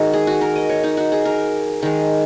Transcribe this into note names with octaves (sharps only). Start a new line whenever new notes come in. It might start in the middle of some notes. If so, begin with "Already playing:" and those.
Already playing: D#3 G#3 D#4 F#4
G#4
F#4
A#4
D#5
C#5
D#4
F#4
G#4
A#4
D#3 G#3